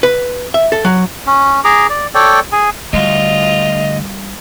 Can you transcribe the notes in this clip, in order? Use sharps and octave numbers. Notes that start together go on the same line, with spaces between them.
B4
E5
A4
F#3
C#4
G#4 A#5 D6
D5
A4 C#5 D5 G5
G#4 G#5
D2 G3 F4 D#5